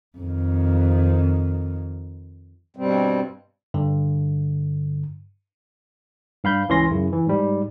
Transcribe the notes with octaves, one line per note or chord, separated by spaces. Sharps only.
F2 D#3
G2 B2 G3 C4
G2 D3
G2 F5 B5 G6
C#2 E3 C#4 C6 A#6
F#2 C#3 E4
E3
G#2 G3